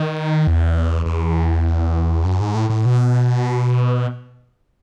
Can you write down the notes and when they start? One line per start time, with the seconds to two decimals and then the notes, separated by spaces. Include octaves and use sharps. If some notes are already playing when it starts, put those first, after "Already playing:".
Already playing: D#3
0.47 E2
1.06 E2
2.25 F#2
2.40 G#2
2.55 A2
2.70 A2
2.85 B2